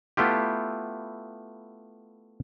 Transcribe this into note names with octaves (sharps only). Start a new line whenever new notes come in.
A3 B3 E4 F4 G4